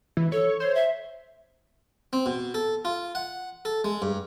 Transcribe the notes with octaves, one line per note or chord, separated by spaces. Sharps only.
E3
A4 C#5
C5 C#5
E5
C4
B2
A4
F4
F#5
A4
G#3
G2